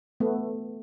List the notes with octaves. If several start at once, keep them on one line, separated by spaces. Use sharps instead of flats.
A3 B3